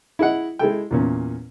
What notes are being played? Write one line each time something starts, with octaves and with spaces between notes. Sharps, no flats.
E4 G#4 D#5 F#5
G#3 E4 A4 G5
E2 A#2 C#4